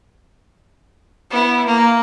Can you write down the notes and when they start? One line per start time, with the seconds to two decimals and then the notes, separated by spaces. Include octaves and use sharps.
1.30 B3 E4
1.66 A#3